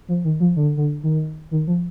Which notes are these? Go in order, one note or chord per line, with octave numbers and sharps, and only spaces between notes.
F3
D#3
F3
D3
D3
D#3
D#3
F3